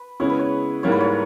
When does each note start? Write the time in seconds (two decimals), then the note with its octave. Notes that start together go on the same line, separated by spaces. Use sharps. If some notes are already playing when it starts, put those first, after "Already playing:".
Already playing: B4
0.20 C#3 G#3 B3 E4 C#5
0.30 B4
0.39 C#5
0.83 G#2 G3 A#3 E4 C#5
0.92 B4
1.00 C#5